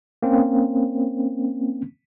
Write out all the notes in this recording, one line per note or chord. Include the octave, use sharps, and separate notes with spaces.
A#3 C4 C#4